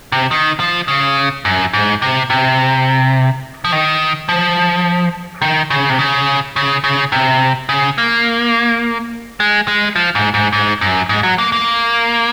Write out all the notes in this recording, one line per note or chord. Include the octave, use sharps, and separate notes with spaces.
C3
D#3
F3
C#3
F#2
G#2
C3
C3
F3
D#3
F3
D#3
C#3
C3
C#3
C#3
C#3
C3
C#3
A#3
G#3
G#3
F3
G#2
G#2
G#2
F#2
G#2
F#3
A#3
A#3